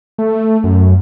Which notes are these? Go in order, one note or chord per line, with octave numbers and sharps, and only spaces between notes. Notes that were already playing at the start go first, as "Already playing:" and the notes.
A3
F#2